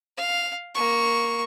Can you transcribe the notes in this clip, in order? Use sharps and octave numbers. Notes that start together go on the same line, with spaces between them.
F5
A#3 C#6